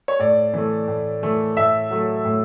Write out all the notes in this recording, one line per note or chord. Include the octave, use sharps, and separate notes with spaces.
C#5
A2 D5
E3 A3
A2
E3 A3
A2 E5
F#3 A3
A2